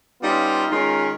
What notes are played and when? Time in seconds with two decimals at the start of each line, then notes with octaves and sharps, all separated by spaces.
0.22 G3 B3 C#4 D#4 F4
0.71 D#3 G#3 C#4 F4 A#4